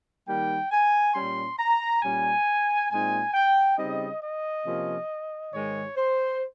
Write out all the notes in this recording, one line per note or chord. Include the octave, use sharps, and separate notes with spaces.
D#3 G3 A#3 D#4 G5
G#5
A#2 G3 C#4 C6
A#5
A#2 G3 C#4 G#5
A#2 G#3 C4 D#4 G#5
G5
C#3 G3 C4 D#4 D#5
D#5
C3 F3 A#3 C#4
G#2 D#3 G#3 C#5
C5